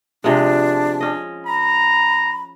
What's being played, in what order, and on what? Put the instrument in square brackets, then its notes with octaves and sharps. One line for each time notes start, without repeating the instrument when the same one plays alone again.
[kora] C3 F3 G#3 [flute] D4
[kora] C#4 D#5
[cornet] A#5 [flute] B5